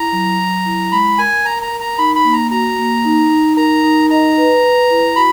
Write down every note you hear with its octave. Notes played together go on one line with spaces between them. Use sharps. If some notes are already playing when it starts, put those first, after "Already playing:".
Already playing: E4 A#5
F#3
F#3
E4
G#3 B5
A#4 G#5
A#4 A#5
A#5
A#4
A#5
D#4 B5
B5
A#3
A#5
F#4 A#5
A#3
D#4
D#4
A#4 A#5
D#4
D#5 A#5
B4
B4
E4
F#4 B5